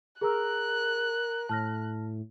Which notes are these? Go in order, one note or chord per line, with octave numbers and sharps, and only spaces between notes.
G#4 A#4 A#5 E6 F#6
A2 A5 F6 A#6